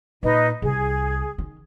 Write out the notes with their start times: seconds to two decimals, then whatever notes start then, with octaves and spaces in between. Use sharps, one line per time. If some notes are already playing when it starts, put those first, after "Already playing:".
0.23 A#2 D#4 B4 D#5
0.62 C2 G#4
1.38 D#3